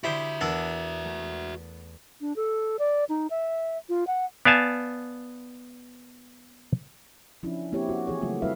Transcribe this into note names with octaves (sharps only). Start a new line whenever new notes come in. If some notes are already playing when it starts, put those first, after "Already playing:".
D3 E4 F#4 G4 C5 E5 D#6
E2 B3 D4 A#4 A5 E6
A3
D4
A4
D5
D#4
E5
F4
F#5
B3 D5 F5 G#5 A5
F3 C#4 D4 E4
A#3 C4 E4 G4 C#5
F#4
E3 G#4 C#5
C#3 F#3 A3 B3 F4 F#4
G3 C4 E4 B4 E5 F5